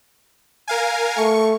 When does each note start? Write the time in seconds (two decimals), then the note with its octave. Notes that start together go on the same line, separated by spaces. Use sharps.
0.68 A#4 F5 G#5
1.17 A3 C#6